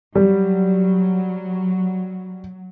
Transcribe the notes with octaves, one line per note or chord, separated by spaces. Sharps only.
F#3 G3